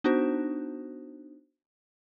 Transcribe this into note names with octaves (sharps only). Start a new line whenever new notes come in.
B3 D4 D#4 F#4 C5